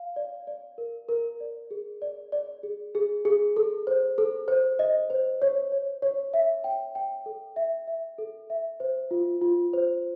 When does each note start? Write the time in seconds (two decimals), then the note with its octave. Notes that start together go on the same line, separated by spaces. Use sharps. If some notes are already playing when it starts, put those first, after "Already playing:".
Already playing: F5
0.16 D5
0.47 D5
0.78 A#4
1.09 A#4
1.40 D5
1.71 G#4
2.02 D5
2.32 D5
2.63 G#4
2.95 G#4
3.25 G#4
3.57 A4
3.87 C5
4.18 A4
4.48 C5
4.79 D#5
5.10 C5
5.42 C#5
5.72 C#5
6.02 C#5
6.34 E5
6.64 G5
6.95 G5
7.26 A4
7.56 E5
7.88 E5
8.19 A4
8.50 E5
8.80 C5
9.11 F4
9.42 F4
9.73 C5